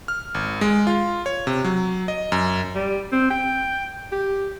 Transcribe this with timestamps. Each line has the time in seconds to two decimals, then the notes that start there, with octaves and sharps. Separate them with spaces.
0.08 F6
0.34 G#1
0.61 G#3
0.87 F4
1.26 C#5
1.47 C3
1.65 F#3
2.08 D#5
2.32 F#2
2.75 G3
3.12 C4
3.30 G5
4.12 G4